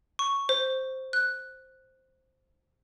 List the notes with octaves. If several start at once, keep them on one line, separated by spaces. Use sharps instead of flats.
C#6
C5
F#6